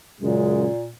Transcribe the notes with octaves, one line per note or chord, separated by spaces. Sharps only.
F#2 A#2 C#3 G#3